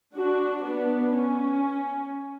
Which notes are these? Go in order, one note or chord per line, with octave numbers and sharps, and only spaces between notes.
D4 F#4
B3 D4
C#4